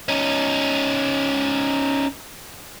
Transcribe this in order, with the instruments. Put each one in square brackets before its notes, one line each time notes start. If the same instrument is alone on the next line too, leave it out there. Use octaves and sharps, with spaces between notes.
[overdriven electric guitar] C#4 D#4